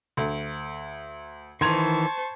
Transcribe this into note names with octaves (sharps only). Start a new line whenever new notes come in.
D2
D#3 E3 C5 A5 C6 C#6 G#6 F7